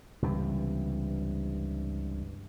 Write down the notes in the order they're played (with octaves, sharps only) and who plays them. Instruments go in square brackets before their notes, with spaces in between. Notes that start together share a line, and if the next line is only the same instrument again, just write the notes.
[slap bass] C#2 G2 C3 E3